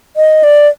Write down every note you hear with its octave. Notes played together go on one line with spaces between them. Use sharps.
D#5
D5